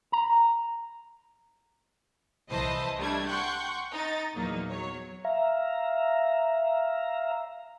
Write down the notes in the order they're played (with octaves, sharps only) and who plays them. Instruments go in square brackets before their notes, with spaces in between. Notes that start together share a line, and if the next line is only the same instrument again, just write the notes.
[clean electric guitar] A#5
[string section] C2 E3 C5 D#5 A5 B5
G3 A3 D4 G#6
F#5 G5 C6 C#6 G6
D#4 A6
E2 A#2 F#3 A#3 D#4
F#3 C#5
[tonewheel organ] E5 F5 A#5